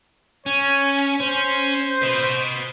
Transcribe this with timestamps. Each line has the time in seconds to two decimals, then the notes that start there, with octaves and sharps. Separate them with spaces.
0.46 C#4 C#5
1.21 C#4 C5
2.02 B4 D#5